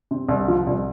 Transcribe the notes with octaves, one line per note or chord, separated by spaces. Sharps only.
C3
C2
F3
C2